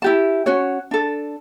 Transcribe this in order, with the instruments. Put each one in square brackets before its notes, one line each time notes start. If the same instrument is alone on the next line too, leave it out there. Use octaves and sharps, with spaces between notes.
[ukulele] E4 G4 A5
C#4 F#4 C#5
D4 A4